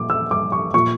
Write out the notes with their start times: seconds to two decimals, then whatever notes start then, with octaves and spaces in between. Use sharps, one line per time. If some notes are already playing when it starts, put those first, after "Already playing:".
Already playing: A#2 G3 D6
0.10 E6
0.31 G3 D6
0.52 C#6
0.74 A#2 C#6